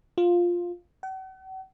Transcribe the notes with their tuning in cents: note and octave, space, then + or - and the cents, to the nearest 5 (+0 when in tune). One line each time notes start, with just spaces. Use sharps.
F4 +5
F#5 +45